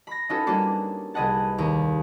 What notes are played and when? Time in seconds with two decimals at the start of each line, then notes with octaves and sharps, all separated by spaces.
0.07 B5 A#6
0.29 C#4 D#4 F4 F#4 A4 B4
0.47 G3 A#3 C#4 D4 F#4
1.14 C2 G#4 B4 D#5 F#5 A5
1.58 D#2